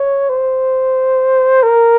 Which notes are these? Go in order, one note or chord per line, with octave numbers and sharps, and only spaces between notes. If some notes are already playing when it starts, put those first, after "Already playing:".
Already playing: C#5
C5
A#4